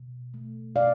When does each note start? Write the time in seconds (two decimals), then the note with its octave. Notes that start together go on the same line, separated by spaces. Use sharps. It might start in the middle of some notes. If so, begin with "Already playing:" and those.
Already playing: B2
0.34 A3
0.75 B2 D5 F5